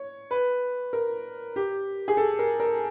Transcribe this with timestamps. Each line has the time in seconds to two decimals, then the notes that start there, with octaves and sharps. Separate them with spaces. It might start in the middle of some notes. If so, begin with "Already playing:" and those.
Already playing: C#5
0.31 B4
0.93 A#4
1.56 G4
2.08 G#4
2.17 A4
2.39 A#4
2.60 A#4